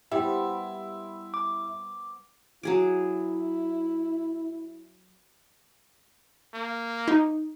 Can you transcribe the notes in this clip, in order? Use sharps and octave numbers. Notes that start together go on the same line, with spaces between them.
G3 B3 E4 C5
D6
F#3 E4 G#4 D6
A#3
D#4